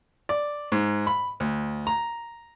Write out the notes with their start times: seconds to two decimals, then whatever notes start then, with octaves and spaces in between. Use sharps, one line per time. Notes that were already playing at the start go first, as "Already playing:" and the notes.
0.29 D5
0.72 G#2
1.07 B5
1.40 D2
1.87 A#5